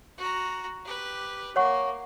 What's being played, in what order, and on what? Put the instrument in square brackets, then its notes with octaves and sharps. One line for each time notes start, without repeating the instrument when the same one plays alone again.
[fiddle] F#4 A#5
G4 B4
[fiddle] A#3 [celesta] C#5 F#5 C#6